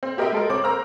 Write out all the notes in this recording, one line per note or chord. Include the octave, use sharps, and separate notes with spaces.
C4
F#4 G4 A#4 D#5 E5 G5
G#3 A4 A#4
C#2 C4 C#5 D6
A#4 C5 A#5 E6 F6